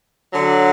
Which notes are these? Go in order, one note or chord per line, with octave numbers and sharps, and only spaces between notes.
D3 F#3